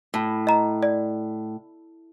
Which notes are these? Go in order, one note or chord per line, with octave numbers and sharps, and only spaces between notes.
A2
D#5 A#5
D5